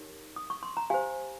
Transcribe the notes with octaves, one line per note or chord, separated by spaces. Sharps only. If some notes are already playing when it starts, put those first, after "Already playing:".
Already playing: D#4 G4 A#4 C#5
D#6
C#6
C6
A#5
G4 C5 F5 G#5